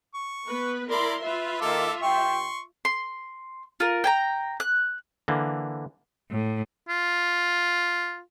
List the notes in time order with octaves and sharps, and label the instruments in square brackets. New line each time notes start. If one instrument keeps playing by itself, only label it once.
[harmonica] C#6
[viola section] B3 B4
[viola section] E4 A#4 C6 [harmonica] D5 B5
[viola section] F4 E5 [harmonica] B4
[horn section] D#3 A#3 [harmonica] A4 D6
[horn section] G2 G5 [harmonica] C6 C#6
[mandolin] C6
F4 A#4
G5 G#5 A#5
F#6
[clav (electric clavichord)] D3 E3 A#3
[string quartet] A2
[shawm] F4